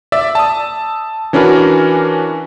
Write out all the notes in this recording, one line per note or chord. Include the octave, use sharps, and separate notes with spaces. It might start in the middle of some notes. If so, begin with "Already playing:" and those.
D5 E5 E6
A5 D#6
E3 C#4 D4 F#4 A#4 B4